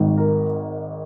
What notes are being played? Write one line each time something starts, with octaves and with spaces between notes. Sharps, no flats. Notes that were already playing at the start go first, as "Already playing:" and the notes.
Already playing: G#1 G#2 D#3
A#4